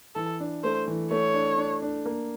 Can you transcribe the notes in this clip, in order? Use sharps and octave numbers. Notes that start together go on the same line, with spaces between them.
E3 A4
D4
A3 C5
E3
A3 C#5
D4
D4
D4
A#3